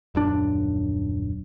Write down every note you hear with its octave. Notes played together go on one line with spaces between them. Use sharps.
D#1 F#2 D4